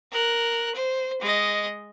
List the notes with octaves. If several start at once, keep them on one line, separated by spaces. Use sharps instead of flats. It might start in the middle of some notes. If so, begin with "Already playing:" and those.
A#4 F#6
C5
G#3 D#5